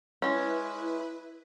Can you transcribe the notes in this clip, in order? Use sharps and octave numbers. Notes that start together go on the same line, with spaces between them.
G#3 C#4 E4 B4